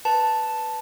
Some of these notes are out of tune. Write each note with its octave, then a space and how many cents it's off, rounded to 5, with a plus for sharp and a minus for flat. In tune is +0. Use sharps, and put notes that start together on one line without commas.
B4 +0 A5 +0